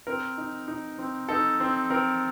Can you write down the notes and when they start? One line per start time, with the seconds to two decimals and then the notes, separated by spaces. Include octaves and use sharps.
0.07 C4 A#4
0.38 D#4
0.68 D#4
0.98 C4
1.29 D#4 A4
1.60 C4
1.90 C4 A#4